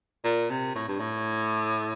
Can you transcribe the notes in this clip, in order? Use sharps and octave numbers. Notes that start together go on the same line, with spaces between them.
A#2
C3
A2
G2
A2